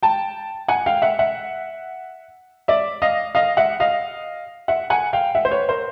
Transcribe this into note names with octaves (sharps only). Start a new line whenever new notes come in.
G5 A5
F#5 G#5
F5 G5
E5 F#5
E5 F#5
D5 E5
D#5 F5
D#5 F5
E5 F#5
D#5 F5
E5 F#5
F#5 G#5
F5 G5
E5 F#5
C5
B4 C#5
A#4 C5